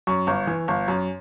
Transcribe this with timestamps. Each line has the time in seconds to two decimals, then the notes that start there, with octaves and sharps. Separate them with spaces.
0.07 F#2 C#6
0.27 G1
0.47 E3
0.68 G1
0.88 F#2